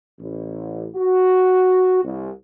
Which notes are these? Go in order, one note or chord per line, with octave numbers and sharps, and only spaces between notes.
A1
F#4
C2